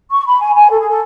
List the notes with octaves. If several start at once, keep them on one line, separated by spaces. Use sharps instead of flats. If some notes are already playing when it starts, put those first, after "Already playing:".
C#6
B5
G#5
G#5
A4
G#4
A4